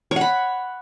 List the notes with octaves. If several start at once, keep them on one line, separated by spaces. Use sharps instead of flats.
C#5 F#5 B5